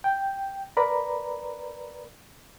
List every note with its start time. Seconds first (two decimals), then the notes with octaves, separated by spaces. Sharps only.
0.04 G5
0.77 A#4 B4 D5 A#5 B5